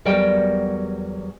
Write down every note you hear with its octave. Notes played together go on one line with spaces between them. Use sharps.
E2 F#3 G3 A#4 D5 G5